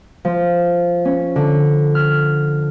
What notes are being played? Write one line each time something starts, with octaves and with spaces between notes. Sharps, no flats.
F3
C#4
D3
F6